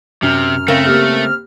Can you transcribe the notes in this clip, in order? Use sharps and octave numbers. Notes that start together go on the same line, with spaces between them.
F#2 C3 F6
C#3 A3 C4 A#4
A#3 G4